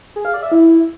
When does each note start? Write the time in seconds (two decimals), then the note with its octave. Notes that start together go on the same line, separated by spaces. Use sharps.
0.16 G#4
0.25 F5
0.34 D5
0.43 E5
0.52 E4